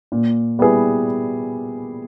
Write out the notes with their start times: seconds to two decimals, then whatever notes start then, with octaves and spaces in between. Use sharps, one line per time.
0.12 A#2
0.59 G3 B3 E4 G#4